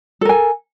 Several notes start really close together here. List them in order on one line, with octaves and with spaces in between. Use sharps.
A4 A#4 G#5